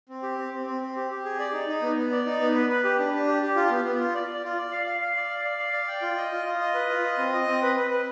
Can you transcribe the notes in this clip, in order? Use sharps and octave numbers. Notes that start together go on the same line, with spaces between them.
C4
G4
C4
C4
C4
C4
G4
G4
G#4
D5
D#4
D#4
B3
B3
D5
D#4
B3
B4
B4
G4
D4
D4
G4
G4
F4
B3
B3
F4
D5
D5
F4
D5
F5
F5
F5
D5
F5
D5
F5
D5
G5
F4
D#5
F4
F4
D#5
B4
F4
D#5
C4
D#5
C4
B4
B4
B4